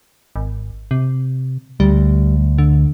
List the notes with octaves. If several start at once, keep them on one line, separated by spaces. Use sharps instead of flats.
G#1
C3
D2 G3
D3